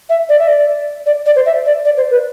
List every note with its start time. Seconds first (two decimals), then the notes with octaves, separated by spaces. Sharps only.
0.09 E5
0.29 D5
0.39 E5
0.48 D5
1.06 D5
1.26 D5
1.36 C5
1.46 E5
1.65 D5
1.85 D5
1.97 C5
2.11 B4